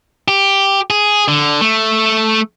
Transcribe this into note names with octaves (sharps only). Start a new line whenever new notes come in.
G4
G#4
D3
A3